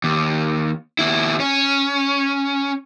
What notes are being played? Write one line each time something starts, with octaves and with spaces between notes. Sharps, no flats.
D#2
D#2 E4
C#4